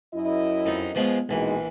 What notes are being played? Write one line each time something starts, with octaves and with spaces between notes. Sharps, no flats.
F#2 E4 D#5
F2 D#4
B2 F3 G#3
A#1 B2 E3 G#3 D#4